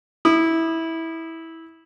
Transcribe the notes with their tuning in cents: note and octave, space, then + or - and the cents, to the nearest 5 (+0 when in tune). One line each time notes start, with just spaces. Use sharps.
E4 -15 D#6 -35